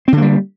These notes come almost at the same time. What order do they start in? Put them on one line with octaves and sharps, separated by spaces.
C4 D3 A#3 G3